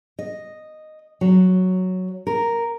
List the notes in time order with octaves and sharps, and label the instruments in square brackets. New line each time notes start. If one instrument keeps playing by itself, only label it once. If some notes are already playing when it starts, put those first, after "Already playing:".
[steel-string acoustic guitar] D#5
F#3
A#4